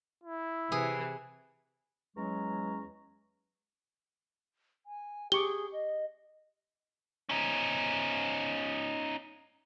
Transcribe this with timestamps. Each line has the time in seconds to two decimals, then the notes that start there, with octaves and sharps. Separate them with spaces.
0.24 E4
0.72 C3 E3 G#4
2.16 E2 F#3 G#3 C#4 A#5 C#6
4.86 G#5
5.32 G4 G#4 C#6 D6 G7
5.72 D#5
7.29 C#4 D#4